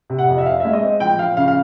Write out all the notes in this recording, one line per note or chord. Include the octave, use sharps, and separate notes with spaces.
C3
F#5
F2
E5
C4 F5
G#3 E5
D#5
C4
F3 G5
F3 F5
C#3 F5
F5